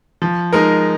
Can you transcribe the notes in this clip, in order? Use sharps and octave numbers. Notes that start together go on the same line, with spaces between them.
F3
G#3 D#4 A#4